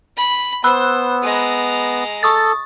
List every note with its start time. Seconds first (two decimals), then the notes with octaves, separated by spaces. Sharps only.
0.17 B5
0.64 B3 C5 B5 E6 F#6
1.23 G#3 A#5
2.23 A4 C#6 D#6 A6